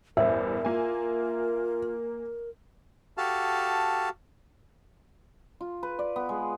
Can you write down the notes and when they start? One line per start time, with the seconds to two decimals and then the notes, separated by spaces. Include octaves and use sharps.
0.17 A1 E2 G2 A#4 C5 E5
0.65 A#3 F4 G#5
3.18 F#4 G4 A4 F5 A5
5.61 F4
5.83 B4
5.99 D5
6.16 B3
6.29 G#3